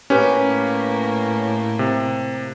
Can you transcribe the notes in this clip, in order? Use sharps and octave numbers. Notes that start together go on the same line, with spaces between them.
A2 A#3 C#4 G4 B4
C3